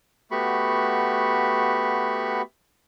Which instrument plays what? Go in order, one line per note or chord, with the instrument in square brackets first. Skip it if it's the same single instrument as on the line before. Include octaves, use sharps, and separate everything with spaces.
[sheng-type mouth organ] A3 B3 F#4 G4 B5 C#6